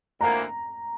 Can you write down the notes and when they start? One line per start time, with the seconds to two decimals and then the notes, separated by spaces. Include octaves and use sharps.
0.21 D2 D3 F3 A#3 E4 A#5